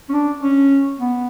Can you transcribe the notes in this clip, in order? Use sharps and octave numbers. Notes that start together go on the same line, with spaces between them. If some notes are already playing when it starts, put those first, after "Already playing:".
C#4
D4
C#4
B3